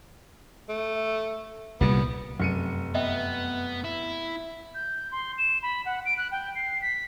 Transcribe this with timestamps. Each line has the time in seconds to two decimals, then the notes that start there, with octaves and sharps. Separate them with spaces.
0.69 A3
1.81 C2 A#2 G3 B3
2.39 F1 F#2 C#7 D#7
2.95 B3 D#5 E5 G5
3.84 E4
4.75 G6
5.12 C6
5.38 E7
5.63 B5
5.86 F#5
6.05 D7
6.18 F#6
6.32 G5
6.55 C7
6.82 B6